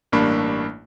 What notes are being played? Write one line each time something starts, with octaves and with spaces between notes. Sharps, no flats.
A1 G2 A#3 D4 B5 C#6